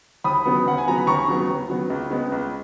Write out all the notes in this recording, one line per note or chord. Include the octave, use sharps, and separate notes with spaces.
D#2 B5 D#6
C#3 F#3 B3
D#2 F#5
G#5
C#3 F#3 B3 A#5
B5
D#2 A#5 C#6
C#3 F#3 B3
D#2
C#3 F#3 B3
C#2
C#3 G#3 B3
C#2